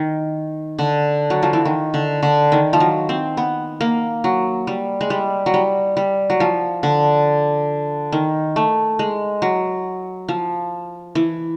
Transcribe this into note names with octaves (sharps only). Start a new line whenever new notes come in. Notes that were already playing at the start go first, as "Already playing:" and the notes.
Already playing: D#3
D3
F#3
F3
E3
D#3
D3
D3
D#3
F3
F#3
C4
B3
A#3
F#3
G3
G#3
G3
F#3
G3
G3
F#3
F3
D3
D#3
A3
G#3
F#3
F3
E3